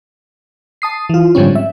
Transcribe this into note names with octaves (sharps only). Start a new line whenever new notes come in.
A5 D#6 C7
E3 F4
G#2 D3 F3 G3 C4 C#4
E5